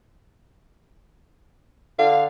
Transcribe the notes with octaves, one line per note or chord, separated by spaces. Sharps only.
D3 F5